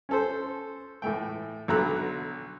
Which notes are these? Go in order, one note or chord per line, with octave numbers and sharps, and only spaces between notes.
C#4 A4 C5
A2 E3 A3 G5
B1 D3 F#3 A#5 B5 F#6